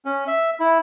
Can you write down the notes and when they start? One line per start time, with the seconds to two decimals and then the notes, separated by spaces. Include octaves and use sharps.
0.05 C#4
0.27 E5
0.60 E4